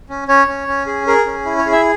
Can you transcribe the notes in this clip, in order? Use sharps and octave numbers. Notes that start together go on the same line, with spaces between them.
C#4
C#4 C#5
C#4
C#4
G#4
G#4 A#4
C#4
E4
C#5
G#4
E5